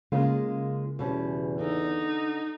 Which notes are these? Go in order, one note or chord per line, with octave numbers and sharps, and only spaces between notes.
C#3 G#3 A#3 F4
E2 B2 G3 C#4
D3 D#4